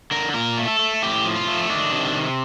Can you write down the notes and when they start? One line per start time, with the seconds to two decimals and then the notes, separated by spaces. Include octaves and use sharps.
0.11 D3 A#4
0.34 A#2 A#4
0.57 A3
0.68 A4
0.79 A3
1.02 A2 G4
1.25 F3
1.36 F4
1.47 A3
1.70 D#3 D4
1.92 C3
2.15 C3